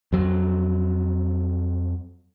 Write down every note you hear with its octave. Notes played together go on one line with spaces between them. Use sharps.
F2 F#3